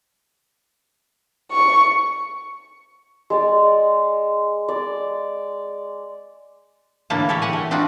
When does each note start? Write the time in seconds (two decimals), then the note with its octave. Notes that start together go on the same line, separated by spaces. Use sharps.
1.52 C#6
3.30 G#3 D5
4.68 D5
7.10 A2 D3 E3 A#3 E4 A5
7.29 G4 A4 A#4 C#5 D5 E5
7.42 G4 F#5 G#5
7.53 A3
7.71 C4 D4 D#4 F4 F#4